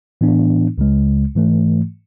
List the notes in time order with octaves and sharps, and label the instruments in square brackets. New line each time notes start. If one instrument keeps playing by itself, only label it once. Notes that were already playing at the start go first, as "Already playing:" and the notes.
[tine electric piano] A2 E3 B3 D4
C#2 C#3 G#3
G#2 E3 A3